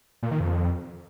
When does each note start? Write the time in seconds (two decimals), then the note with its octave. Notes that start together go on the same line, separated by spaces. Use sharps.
0.23 A#2
0.31 D#3
0.40 F2